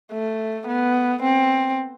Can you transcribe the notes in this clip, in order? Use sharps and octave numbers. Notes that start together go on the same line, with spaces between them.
A3
B3
C4